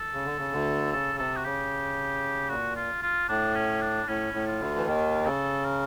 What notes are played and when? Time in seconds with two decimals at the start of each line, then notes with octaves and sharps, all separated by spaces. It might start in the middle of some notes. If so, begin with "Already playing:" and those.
Already playing: A4
0.14 C#3
0.25 D3
0.38 C#3
0.53 D2 D3
0.93 C#3 A4
1.18 C3 A4
1.37 F#4
1.44 C#3 G4
2.49 A#2 F#4
2.76 F4
3.02 F4
3.28 A2 D4
3.55 C#4
3.81 D4
4.08 A2 C#4
4.34 A2
4.47 F4
4.60 D2 D3
4.77 E3
4.86 D#2 D#3 F4
5.26 C#3 A4
5.65 A#4